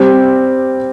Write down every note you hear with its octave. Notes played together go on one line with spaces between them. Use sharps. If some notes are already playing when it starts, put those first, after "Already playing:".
Already playing: G3 C4 G4